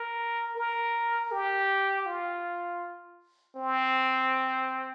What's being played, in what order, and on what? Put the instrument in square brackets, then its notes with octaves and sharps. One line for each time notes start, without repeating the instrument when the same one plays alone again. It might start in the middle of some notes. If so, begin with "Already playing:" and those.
Already playing: [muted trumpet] A#4
A#4
G4
F4
C4